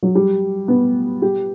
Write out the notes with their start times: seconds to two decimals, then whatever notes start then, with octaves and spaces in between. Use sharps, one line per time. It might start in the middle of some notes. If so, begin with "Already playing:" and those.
0.03 F#3
0.15 G3
0.68 B3
1.22 G4